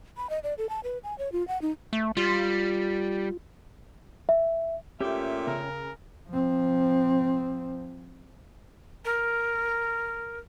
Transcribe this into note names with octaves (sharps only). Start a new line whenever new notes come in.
B5
D#5
D5
A4
A5
B4
G#5
C#5
F4
F#5
D#4
A3
G3 F4
E5
A#2 A3 C#4 G4 E5 G5
C#3 A#4
F3 C4
A#4